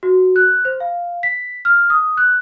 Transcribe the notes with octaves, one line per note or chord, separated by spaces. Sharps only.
F#4
F#6
C5
F5
B6
F6
D#6
F#6